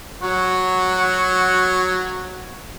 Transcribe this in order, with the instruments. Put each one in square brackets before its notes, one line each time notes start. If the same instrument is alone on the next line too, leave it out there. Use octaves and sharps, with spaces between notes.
[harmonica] F#3 [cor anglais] F#4